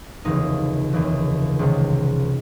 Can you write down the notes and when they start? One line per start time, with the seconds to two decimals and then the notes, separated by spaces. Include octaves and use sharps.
0.25 F1 D#2 C#3 E3 D#4
0.93 F1 D#2 C#3 E3
1.59 C#2 C3 D#3